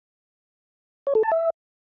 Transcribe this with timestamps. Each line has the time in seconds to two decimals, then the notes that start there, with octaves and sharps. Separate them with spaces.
1.07 C#5
1.15 A4
1.23 A5
1.32 E5